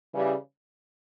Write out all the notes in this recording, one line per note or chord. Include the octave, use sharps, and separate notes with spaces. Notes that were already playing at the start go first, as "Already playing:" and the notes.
C#3 E3 G3